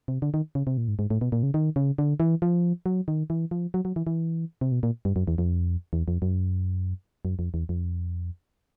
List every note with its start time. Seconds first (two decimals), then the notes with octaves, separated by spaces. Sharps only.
0.08 C3
0.22 D3
0.34 D#3
0.55 C#3
0.67 C3
0.77 A#2
0.88 G#2
0.99 G#2
1.10 A2
1.21 B2
1.32 A#2
1.43 C#3
1.54 D#3
1.76 C#3
1.98 D3
2.20 E3
2.42 F3
2.86 F#3
3.08 D#3
3.30 E3
3.51 F3
3.74 F#3
3.85 F#3
3.96 E3
4.07 E3
4.61 C3
4.72 B2
4.83 A#2
5.05 G2
5.16 F#2
5.28 E2
5.38 F2
5.93 E2
6.08 F2
6.22 F#2
7.25 F#2
7.39 F2
7.54 E2
7.69 F2